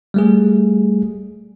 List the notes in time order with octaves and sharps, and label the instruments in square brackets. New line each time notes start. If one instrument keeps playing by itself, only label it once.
[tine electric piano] G3 A3 G#4